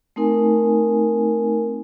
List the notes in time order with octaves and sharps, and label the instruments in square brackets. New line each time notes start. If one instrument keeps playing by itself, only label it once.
[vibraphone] A3 C4 D#4 A#4 G#5